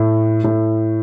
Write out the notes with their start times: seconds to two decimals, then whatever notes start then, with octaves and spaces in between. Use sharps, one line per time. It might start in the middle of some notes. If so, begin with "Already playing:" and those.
Already playing: A2
0.44 A2